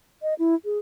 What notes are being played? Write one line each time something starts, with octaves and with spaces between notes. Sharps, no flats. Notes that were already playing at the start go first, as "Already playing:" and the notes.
D#5
E4
G#4